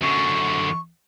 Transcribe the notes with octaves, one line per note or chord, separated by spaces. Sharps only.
F#2 D3 C#6